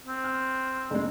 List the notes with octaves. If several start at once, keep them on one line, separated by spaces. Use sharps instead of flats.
C4
F6
F#1 G#3